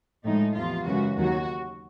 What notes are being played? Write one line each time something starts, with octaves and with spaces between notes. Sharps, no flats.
A2 F3 G#3 D#4
E2 C3 F3 F4
F#2 C#3 E3 G#3 F#4
D#2 D#3 F#3 F#4